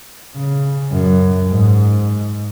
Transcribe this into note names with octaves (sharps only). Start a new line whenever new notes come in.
C#3
F#2
G#2